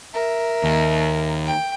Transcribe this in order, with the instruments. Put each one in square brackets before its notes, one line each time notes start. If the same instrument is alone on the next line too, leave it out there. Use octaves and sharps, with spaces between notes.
[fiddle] A#4 E5
[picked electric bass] D#2
[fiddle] G5